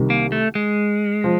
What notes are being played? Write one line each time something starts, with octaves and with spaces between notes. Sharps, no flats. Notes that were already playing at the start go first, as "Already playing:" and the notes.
Already playing: C2 C3 D#3
A#3
A3
G#3
F3